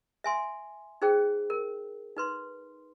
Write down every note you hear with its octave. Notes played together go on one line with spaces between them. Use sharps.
E5 G#5 C6
D#4 G#4 C5 G5
A#4
D#4 B4 C6